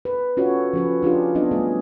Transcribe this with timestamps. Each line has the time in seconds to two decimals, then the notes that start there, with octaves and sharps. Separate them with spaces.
0.05 B4
0.37 C#4 F4 F#4 A4 C#5
0.73 F3 C#4 B4
1.02 D4 F4 G4 G#4
1.35 F3 F#3 B3 C4 D4 D#5
1.51 G3 A3 G#4